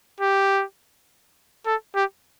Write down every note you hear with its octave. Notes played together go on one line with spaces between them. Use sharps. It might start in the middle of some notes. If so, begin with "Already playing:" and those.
G4
A4
G4